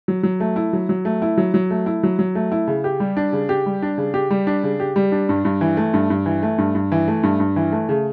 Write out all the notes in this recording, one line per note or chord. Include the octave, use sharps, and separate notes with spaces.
F#3
F#3
A3
E4
F#3
F#3
A3
E4
F#3
F#3
A3
E4
F#3
F#3
A3
E4
C#3
G4
G3
D4
C#3
G4
G3
D4
C#3
G4
G3
D4
C#3
G4
G3
D4
G2
G2
E3
A3
G2
G2
E3
A3
G2
G2
E3
A3
G2
G2
E3
A3
C#3